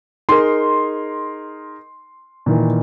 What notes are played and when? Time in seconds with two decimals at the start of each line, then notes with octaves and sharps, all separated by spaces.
0.29 D#4 G#4 A#4 C6
2.46 A#2 D#3 E3